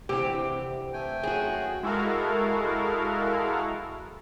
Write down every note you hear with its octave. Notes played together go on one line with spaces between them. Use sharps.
D2 C3 E3 C4 G4
A3 G5 G#5
F#2 F#4 G#4
G#3 E4 F#4 A4 A#4 F5